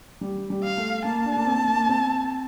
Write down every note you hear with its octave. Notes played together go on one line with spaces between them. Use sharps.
G3
G3
F5
A3
A#3 A5
D4
A#3
C4
A#3
C4